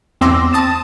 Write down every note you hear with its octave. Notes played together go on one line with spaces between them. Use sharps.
E2 C4 C6 D6 E6 A#6
A5 D#6 A6 E7